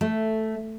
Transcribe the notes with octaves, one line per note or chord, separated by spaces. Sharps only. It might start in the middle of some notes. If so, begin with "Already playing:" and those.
A3